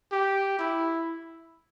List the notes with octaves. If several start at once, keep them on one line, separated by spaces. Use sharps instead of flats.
G4
E4